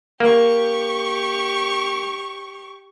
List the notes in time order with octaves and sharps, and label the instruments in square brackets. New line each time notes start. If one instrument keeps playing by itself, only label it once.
[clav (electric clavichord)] A#3 [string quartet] G4 C#6